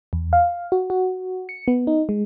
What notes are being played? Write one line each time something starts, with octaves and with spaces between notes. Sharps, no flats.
E2
F5
F#4
F#4
C#7
B3
D#4
G#3